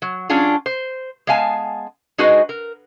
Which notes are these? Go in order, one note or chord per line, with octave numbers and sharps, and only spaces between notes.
F#3
F#3 C#4 D4 F4 G#4
C5
G#3 B3 F5 G#5 A5
G#3 D#4 F#4 G#4 B4 D#5
A#4